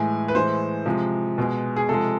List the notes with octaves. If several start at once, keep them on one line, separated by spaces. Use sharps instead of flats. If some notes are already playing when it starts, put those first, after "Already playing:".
Already playing: A2 E3 G#3 G#5
B4
A2 E3 G#3 C5
C3 F3 G#3
B2 G#3
G#4
C3 F3 G#3 A4